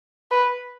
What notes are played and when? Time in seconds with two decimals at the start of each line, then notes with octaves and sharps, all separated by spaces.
0.31 B4